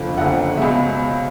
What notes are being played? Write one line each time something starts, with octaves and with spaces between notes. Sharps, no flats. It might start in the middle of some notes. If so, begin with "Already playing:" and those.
Already playing: F#1 F2 D3 F3 F5
F#1 F2 D3 F3 F#5
C#2 B2 G#3 E5